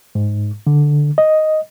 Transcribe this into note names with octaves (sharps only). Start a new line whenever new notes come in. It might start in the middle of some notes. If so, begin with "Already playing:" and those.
G#2
D3
D#5